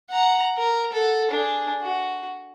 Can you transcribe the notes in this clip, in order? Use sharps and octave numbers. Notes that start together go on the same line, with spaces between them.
F#5 A#5
A#4
A4 F#5
D4 G#4
F#4